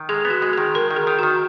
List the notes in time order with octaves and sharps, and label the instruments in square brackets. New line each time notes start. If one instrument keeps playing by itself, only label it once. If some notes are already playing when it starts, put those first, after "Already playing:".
Already playing: [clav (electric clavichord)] D#3
[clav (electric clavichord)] G#3 [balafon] G#4
[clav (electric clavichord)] B3
[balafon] F#4
[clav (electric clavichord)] G#3
[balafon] G#4
[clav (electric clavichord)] D#3
[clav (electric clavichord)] G#3 [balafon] A#4
[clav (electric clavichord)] D#3
[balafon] G#4
[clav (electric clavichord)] D#3
[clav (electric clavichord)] D#3 [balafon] F#4